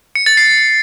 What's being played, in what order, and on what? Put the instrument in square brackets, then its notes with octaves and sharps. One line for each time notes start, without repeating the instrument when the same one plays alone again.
[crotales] C#7
A6
C7